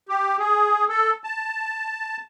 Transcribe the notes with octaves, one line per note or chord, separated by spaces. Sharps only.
G4
G#4
A4
A5